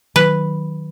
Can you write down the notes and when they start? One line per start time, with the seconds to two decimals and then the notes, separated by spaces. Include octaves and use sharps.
0.16 D#3 F#3 B4